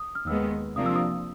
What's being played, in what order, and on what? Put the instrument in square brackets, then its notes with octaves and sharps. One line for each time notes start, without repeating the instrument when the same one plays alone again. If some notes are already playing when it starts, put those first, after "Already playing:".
Already playing: [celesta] D#6
F6
[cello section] D#2 D#3 G#3 B3 [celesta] E6
[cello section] C3 F3 A#3 D4 F4 [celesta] D#6
[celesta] E6
D#6